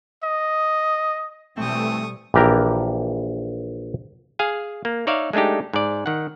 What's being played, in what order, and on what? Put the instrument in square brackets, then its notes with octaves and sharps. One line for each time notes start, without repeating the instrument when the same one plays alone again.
[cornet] D#5
[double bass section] B2 G3 [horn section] E3 C4 [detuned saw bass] A3 [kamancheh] C#6 D#6
[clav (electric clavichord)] A#1 E3 G4 A#4 A#5
G#4 F5 G#5
A#3
D#4 C#5 D5 E5 F5
G#3 A3 D4 D#4 G4
G#2 D5
D#3 F#5